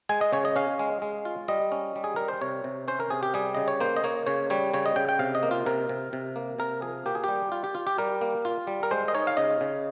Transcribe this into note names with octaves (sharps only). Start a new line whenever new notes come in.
G#3 G#5
D#5
C#3 C#5
D#5
C#4 F5
G#3
G#3
F4
G3 D#5
C#4
G3
G#4
G3 A#4
C5
C3 C#5
C3
C#4 C5
A#4
C3 G#4
G4
G3 G#4
C#3 D#5
C#5
A#3 C5
D#5
A#3 C#5
C#3 C#5
G3 C#5
C#3 C#5
D#5
C#3 G5
G5
C3 F5
D#5
A#3
F4
C3 A#4
C3
C3
A#3
C3 A#4
F3 G#4
A#3 G4
G#4
G3 G4
F4
G4
F4
G4
G3 A#4
A#3
F4
G3
A#4
G#3 C5
D#5
D#4 C#5
F5
C#3 D#5
C#3